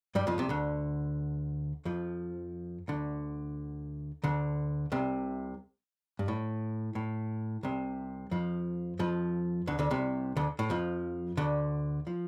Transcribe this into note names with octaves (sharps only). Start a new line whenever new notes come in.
G2 G3
F2 F3
C2 C3
D2 D3
F2 F3
D2 D3
D2 D3
C2 C3
G2
A2
A2
C2 C3
F2 F3
F2 F3
D2 D3
D2 D3
C2 C3
D2 D3
A2
F2 F3
D2 D3
F3